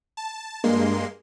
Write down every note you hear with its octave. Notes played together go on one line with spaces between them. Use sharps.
A5
G2 G#3 A#3 C6